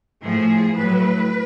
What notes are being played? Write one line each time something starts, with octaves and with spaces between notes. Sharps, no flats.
A2 F3 G#4
A2 F#3 B4